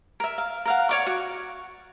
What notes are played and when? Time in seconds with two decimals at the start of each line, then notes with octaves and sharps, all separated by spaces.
0.20 A#4 E5
0.38 F5
0.65 A#4 F5 F#5
0.89 C#5 D5 C#6
1.07 F#4